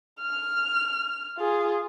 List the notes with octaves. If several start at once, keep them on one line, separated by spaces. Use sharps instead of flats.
F6
F4 G#4